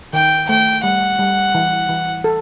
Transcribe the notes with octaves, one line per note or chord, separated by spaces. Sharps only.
D#3 G5
A3 G5
G3 F#5
G3
E3
E3
A4